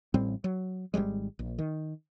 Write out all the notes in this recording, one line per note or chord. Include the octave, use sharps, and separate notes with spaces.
A1 A2 G3 C4
F#3
G#1 C#2 G3 G#3
A#1
D#3